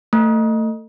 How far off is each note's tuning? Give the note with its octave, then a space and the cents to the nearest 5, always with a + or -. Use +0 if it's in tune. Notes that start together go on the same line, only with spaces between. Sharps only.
A3 +25